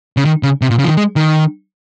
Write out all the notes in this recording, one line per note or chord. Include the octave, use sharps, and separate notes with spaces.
C#3
D#3
C#3
C3
A#2
C#3
F3
D#3
G#3
D#3